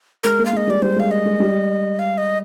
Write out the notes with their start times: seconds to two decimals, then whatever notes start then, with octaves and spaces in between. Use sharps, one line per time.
0.24 G#3 A#4
0.39 A#3
0.46 F5
0.53 G#3 D#5
0.67 G3 D5
0.82 G3 C5
0.96 G#3 F5
1.11 D#5
1.26 G#3
1.40 G3
1.99 F5
2.18 D#5